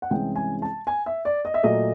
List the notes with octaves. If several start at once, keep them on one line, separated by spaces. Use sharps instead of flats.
F#5
C2 C3 E3 G#3 C#4 G5
G#5
A5
G#5
E5
D5
D#5
E5
A#2 F#3 A3 D#5